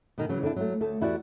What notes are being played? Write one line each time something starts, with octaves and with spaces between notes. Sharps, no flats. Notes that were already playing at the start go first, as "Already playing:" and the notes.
B2 D#3
C#3 E3 F#3
D3 C4 D4 E4
F#3 G#3 A3
D2 A3 A4
E2 E4 F#4 G4 D5 F#5